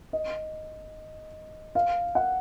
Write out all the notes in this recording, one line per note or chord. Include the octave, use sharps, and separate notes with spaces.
D#5
F5
F#5